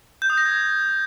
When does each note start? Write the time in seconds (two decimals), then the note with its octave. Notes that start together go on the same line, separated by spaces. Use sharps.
0.22 G6
0.30 D#6
0.38 A#6
0.45 G#6